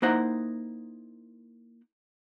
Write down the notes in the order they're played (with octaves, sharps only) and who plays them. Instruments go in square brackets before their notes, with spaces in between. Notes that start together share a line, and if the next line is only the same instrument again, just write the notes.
[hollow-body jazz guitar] A#3 D#4 E4 C5 F#5 A#5